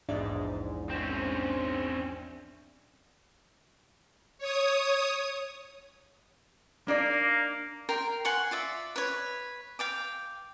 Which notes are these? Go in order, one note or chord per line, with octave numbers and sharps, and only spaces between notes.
A#1 E2 G#2 D4 D5 E5
C4 C#4
C#5 D#6
A#3 D4 D#4 D5
A#4 G5 C6
F#5 G#5 C6 C#6
F4 D5 E5
B4 C#5
F5 G5 D6